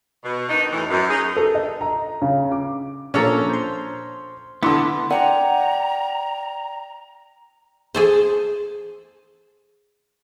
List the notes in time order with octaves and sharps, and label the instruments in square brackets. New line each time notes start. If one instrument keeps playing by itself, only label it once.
[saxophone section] B2
D#3 D4 D#4
E2 A2 E3
F#2
D#4 G#4
[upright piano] A4
D#5
A#5
C#3
D6
[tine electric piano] A#2 F3 A#3 [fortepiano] C#4 C#5 A#5 [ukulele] D4 A4
[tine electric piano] C5 C6
[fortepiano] D3 E4 [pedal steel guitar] B3 C6 [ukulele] D4
[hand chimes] D5 G5 [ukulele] F#5 [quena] A#5
[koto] G#4 A4 C5